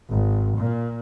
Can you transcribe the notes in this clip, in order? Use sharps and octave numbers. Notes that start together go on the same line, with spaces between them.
G#1
A#2